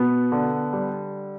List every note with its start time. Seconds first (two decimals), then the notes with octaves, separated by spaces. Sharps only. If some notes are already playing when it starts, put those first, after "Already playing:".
Already playing: B2 B3
0.32 D3
0.73 G3